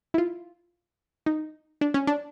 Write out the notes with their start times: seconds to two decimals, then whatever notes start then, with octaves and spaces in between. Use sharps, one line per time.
0.14 E4
0.18 F4
1.26 D#4
1.81 D4
1.94 C#4
2.07 D4